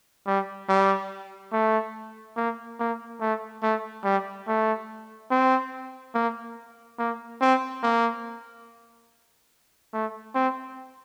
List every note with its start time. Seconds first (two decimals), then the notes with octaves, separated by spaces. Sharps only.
0.27 G3
0.69 G3
1.52 A3
2.37 A#3
2.79 A#3
3.21 A3
3.63 A3
4.04 G3
4.47 A3
5.31 C4
6.15 A#3
6.99 A#3
7.41 C4
7.83 A#3
9.94 A3
10.35 C4